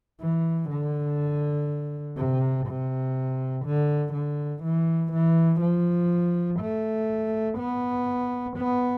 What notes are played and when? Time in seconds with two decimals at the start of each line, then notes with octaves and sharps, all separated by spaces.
0.21 E3
0.70 D3
2.17 C3
2.67 C3
3.66 D3
4.14 D3
4.64 E3
5.13 E3
5.62 F3
6.60 A3
7.58 B3
8.57 B3